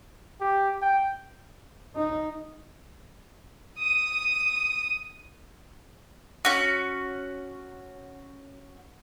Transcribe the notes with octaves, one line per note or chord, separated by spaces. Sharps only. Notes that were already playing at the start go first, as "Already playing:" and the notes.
G4
G5
D#4
D#6 D#7
C#4 F#4